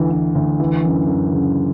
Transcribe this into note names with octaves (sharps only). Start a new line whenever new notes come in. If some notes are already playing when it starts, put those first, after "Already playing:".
Already playing: D2 E3
E3
D2
E3
F#2
F#2
C#3